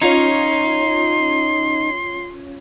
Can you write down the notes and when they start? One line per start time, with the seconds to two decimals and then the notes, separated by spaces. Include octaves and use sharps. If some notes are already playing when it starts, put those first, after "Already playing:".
0.02 C#4 D#4 F4 C#5 C6